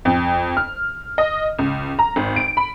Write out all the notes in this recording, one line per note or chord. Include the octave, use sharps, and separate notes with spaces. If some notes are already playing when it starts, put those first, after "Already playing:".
F2
F6
D#5
C#2
A#5
G#1
D7
B5